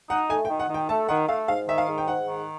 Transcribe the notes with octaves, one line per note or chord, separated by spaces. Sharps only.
D#4 F#5
A3 G#5
G5
D#3
F#5
D#3
G5
A3 A5
D#3 F#5
A3 F5
G#2 F5
D#3 E5
F5
G#2
G5
G#2 F#5
D#3